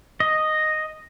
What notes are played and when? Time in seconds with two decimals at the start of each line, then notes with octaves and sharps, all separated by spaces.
0.20 D#5